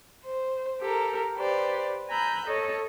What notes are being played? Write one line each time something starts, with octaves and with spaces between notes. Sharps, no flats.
C5
G4 A4 A#4
G4 B4 C5 D5
G#5 A#5 B5 E6 F#6 G6
A4 C#5 D#5